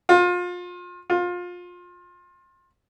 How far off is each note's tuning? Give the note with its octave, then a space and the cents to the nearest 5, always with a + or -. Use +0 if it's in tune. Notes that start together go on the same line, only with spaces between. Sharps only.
F4 +30
F4 +25